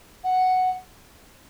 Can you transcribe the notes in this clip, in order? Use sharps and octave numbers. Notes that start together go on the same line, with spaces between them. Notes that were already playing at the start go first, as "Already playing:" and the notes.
F#5